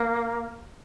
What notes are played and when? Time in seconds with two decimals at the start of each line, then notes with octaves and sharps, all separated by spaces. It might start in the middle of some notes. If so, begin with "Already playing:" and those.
Already playing: A#3